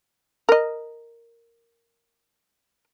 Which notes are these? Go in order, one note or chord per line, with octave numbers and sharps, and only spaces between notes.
A#4 D#5